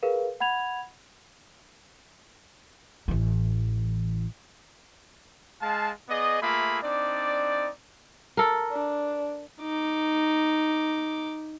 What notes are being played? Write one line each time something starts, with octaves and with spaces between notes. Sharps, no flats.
G#4 A#4 B4 F5
F#5 B5 G#6 F7
A1 E3
G#3 F5 A5
B3 G#4 D5 D#5
A3 A#3 F4 G#4 E5 B5
C4 D4 D#4 D5
A4 A#4
D4
D#4 D6